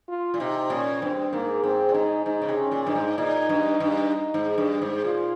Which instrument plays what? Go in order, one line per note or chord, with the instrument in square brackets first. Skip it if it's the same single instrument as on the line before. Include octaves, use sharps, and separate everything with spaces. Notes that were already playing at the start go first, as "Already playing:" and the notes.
[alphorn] F4
[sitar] A#2
[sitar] C3 [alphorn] D#4
[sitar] A#2 [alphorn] C#4
[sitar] G2 [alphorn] C4
[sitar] G#2 [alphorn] A#3
[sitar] G#2 [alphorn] C4
[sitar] A#2
[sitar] G#2 [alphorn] D#4
[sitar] G#2 [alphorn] D#4
[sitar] C#3
C3
[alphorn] C#4
[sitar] A#2
[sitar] G2 [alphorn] D#4
[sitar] G#2
[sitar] A#2 [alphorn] D#4
[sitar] G2
G2
G#2
G2
G#2
[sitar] A#2 [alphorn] F4